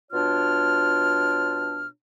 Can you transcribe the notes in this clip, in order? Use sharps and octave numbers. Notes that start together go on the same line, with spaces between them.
B2 D4 F4 C#5 F6